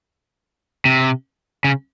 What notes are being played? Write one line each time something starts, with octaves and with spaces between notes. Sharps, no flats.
C3
C#3